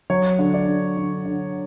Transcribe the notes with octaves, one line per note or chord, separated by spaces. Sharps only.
F#3 C#5
D3
D5
D3
D3
D3